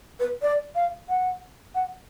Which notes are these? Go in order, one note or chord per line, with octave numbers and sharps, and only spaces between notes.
B4
D5
F5
F#5
F#5